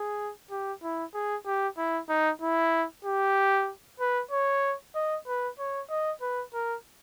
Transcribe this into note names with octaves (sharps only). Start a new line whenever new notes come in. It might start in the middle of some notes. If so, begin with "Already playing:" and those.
Already playing: G#4
G4
E4
G#4
G4
E4
D#4
E4
G4
B4
C#5
D#5
B4
C#5
D#5
B4
A#4